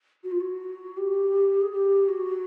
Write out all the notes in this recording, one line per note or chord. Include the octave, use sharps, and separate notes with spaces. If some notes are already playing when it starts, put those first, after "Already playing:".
F#4
F4
F#4
G4
G#4
G4
F#4